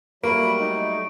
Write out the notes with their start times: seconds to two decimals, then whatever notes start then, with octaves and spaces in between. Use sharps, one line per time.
0.23 F#3 G3 A3 A#3 B5 C#6 D7
0.60 D#4